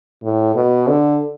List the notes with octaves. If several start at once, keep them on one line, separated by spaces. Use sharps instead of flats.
A2
B2
D3